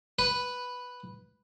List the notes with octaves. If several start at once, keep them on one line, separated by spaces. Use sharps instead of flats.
B4